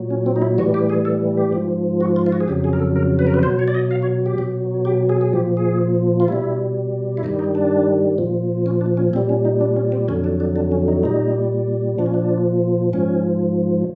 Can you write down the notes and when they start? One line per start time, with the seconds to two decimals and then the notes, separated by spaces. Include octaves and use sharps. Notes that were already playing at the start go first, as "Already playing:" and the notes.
Already playing: A#2 F#3
0.10 C#4
0.26 C4
0.36 D#4
0.42 E4
0.58 A2 E3 G3 F#4
0.74 G4
0.90 G#4
1.05 A4
1.37 G4
1.53 G#2 F3
2.01 F#4
2.16 F4
2.26 F4
2.32 F#4
2.41 G#4
2.48 F2 C#3 F#3 G4
2.64 G#4
2.73 A#4
2.80 A4
2.96 A#4
3.19 B4
3.27 A#4
3.34 B4
3.43 B2 F#3 C5
3.59 C#5
3.68 D5
3.74 D#5
3.91 F5
4.02 C#5
4.26 G4
4.38 B2 F#3
4.85 G4
5.09 G#4
5.21 G#4
5.33 A#2 F3 G4
5.57 G#4
6.20 F4
6.28 B2 G3 E4
7.17 E4
7.23 G2 D#3 G3 D#4
7.39 D#4
7.55 D4
8.18 A#2 F3
8.66 C#4
8.81 D4
8.97 C#4
9.13 A#2 G3 C4
9.29 C#4
9.45 D#4
9.61 D4
9.76 C#4
9.92 C4
10.08 F2 D3 F#3 C#4
10.24 D4
10.40 D4
10.56 D4
10.72 C#4
10.88 D#4
11.03 A#2 G3 D#4
11.98 A#2 F3 D4
12.06 C#4
12.14 D4
12.93 G#2 F3 C#4